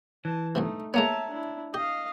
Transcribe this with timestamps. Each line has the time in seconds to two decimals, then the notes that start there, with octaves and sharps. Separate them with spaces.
0.25 E3 A5
0.55 B1 G2 C3 A3 D#4
0.94 G#3 A#3 B3 C#5 E5 A5 A#5
1.30 D4 E4
1.74 G4 D#5 F5